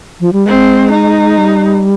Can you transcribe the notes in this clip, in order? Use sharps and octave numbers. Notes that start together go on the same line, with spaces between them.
F3
G3
G#3 C4
D#4
G3